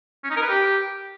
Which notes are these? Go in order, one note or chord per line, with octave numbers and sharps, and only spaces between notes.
C#4
D#4
A#4
B4
G4